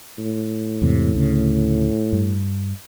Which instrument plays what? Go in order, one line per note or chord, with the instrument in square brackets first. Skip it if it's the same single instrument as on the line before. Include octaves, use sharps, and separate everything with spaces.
[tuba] A2
[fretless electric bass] E2 G#2 C3
D2 C#3
G2